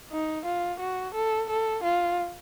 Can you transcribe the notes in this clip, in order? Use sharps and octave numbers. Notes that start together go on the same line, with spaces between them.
D#4
F4
F#4
A4
A4
F4